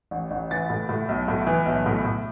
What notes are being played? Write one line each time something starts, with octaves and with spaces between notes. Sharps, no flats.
A1
A1
E3 A6
A2
A2
B1
A2
E3
B1
A2
A2